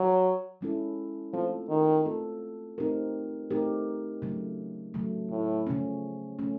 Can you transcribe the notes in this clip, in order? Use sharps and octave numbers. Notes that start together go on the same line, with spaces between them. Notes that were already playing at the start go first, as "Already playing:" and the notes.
Already playing: F#3
F3 G#3 C#4 E4 A4
F3 A3 C4 F4 A4
D#3
A3 C4 F4 A4
A3 C4 D#4 G4 A#4
A3 C4 D#4 G4 A#4
C#3 F#3 A3
C#3 F#3 A3
A2
C#3 F3 A3 C#4
C#3 F3 A3 C#4